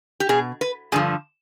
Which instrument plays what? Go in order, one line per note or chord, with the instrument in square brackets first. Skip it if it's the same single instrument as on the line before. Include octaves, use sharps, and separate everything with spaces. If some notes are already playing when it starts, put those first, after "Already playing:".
[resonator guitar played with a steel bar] G4
B2 G#4
B4
G2 D3 F3 G#4